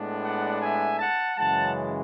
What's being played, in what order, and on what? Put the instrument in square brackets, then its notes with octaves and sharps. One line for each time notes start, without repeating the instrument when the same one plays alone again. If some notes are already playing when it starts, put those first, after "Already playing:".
Already playing: [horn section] A2 G#3 B3 D4
D5 F#5
E5 G#5
F#5 A5
F#2 C#3 E3 G#3 F#5 A5